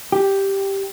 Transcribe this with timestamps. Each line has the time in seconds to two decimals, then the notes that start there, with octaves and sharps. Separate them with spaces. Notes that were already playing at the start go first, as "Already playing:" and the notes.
0.12 G4